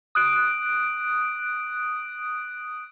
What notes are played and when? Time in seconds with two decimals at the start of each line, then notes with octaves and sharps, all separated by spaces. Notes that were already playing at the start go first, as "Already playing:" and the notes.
0.15 D#6 F#6 D7